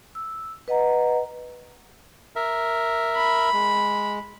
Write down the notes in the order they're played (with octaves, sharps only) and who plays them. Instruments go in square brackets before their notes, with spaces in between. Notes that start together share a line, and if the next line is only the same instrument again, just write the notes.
[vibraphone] E6
B4 D#5 F#5 A#5
[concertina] A#4 E5
[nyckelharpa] B5
[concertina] G#3